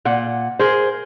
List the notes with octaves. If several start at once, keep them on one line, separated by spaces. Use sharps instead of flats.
A#2 F#5
G#4 A#4 C5